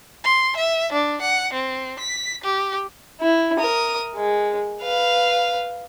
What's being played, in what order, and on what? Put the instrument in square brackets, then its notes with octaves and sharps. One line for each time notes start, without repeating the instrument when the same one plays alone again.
[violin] C6
E5
D4
F#5
C4
B6
G4
[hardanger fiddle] E4
A#4 D#6
G#3
B4 F5